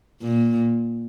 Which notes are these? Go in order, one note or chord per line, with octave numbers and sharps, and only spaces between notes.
A#2